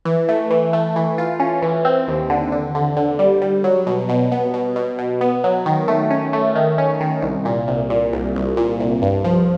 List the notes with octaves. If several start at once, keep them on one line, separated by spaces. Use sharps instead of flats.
E3
A3
E3
A3
E3
F4
C#4
E3
C4
D#2
D3
D3
D3
D3
G3
G3
F#3
B2
B2
B3
B2
B2
B2
B3
F#3
D#3
A3
C#4
A3
D#3
C#4
D#3
C2
A#2
C2
A#2
C2
C2
A#2
C2
G2
F3